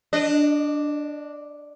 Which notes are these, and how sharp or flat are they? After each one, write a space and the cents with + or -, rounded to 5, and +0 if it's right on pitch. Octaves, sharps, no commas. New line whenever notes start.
D4 +0 D#5 -30